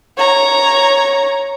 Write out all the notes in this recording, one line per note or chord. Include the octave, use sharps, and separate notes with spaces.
C#5 A#5